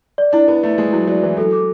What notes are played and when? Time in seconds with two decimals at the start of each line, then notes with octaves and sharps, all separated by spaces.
0.18 D5
0.33 D4 E4
0.48 B3 E4
0.63 A3 E4
0.78 G#3 E4
0.92 F#3 E4
1.07 F#3 D5
1.23 E3 E4
1.37 F#3 A4
1.52 D6